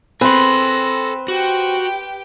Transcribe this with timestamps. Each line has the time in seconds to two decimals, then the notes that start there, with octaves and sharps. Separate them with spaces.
0.21 C4 A4 B4 G#5 C6 A#6
1.28 F#4 G4 G5